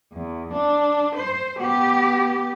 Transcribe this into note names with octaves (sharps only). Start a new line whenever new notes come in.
E2
D4
C5
B3 G4